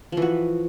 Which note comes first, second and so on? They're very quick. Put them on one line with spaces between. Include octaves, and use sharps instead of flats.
F3 E3 F#4